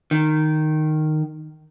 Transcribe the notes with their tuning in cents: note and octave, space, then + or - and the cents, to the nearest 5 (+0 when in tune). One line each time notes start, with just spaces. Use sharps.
D#3 -10